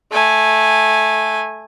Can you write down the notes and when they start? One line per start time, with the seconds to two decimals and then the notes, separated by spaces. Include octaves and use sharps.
0.11 A3 G#5